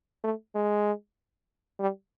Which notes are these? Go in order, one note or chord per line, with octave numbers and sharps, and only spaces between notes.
A3
G#3
G3